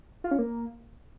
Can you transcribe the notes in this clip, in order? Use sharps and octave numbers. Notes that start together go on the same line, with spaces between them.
F4
C#4
A#3